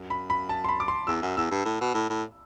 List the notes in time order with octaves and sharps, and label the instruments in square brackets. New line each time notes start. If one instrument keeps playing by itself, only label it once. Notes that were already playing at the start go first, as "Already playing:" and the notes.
Already playing: [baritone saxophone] F#2
[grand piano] B5
B5
A5
C6
B5
D6
C6
[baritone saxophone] E2 [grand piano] E6
[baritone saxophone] F#2
[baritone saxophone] E2 [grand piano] E6
[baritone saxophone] G2
A2
B2
A2
A2